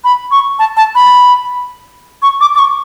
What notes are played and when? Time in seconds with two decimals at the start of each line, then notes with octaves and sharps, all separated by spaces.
0.04 B5
0.31 C#6
0.59 A5
0.77 A5
0.95 B5
2.22 C#6
2.41 D6
2.55 D6
2.59 C#6